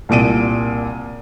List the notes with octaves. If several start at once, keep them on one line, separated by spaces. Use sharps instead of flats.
C2 A#2 D7 D#7